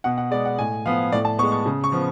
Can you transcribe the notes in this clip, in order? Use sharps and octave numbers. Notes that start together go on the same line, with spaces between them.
B2 F#5
F#5
G#3 B3 D5
F#5
A2 G#5
F3 B3 F5
A2 D5
A5
G#3 B3 C#6
C#6
C#3
C#6
F3 B3